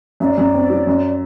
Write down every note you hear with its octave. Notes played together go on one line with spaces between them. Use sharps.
F#2 D5 E5
F#2
C4
F#3
F#2